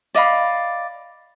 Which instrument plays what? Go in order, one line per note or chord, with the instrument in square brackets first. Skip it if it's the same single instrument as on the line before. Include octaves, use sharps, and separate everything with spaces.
[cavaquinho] D5 D#5 F5 B5